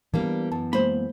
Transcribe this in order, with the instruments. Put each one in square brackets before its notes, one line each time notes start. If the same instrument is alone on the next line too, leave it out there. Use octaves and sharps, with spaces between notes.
[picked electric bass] E3 B3 [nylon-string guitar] G3 A#3 D4
[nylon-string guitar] F#2 [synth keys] A5
[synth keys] G#3 A#3 [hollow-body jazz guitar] C5 B5